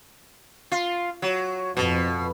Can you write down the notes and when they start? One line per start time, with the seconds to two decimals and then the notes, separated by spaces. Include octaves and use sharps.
0.72 F4
1.22 F#3
1.77 F2 B2